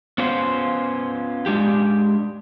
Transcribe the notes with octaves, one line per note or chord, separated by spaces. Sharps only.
B3 C#4 F4 C5
G#3 D4 G4